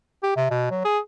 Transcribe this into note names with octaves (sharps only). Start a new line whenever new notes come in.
G4
C3
B2
F#3
G#4